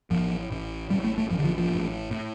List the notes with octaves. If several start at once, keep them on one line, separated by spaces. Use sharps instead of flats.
A1 A2 F3
A1 A2
A1 A2 G3
A3
A3
A1 A2 F3
D3
F3
F3
A1 A2
A2